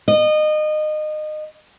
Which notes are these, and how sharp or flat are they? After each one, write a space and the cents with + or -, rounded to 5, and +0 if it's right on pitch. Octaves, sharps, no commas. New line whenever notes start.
D#5 -25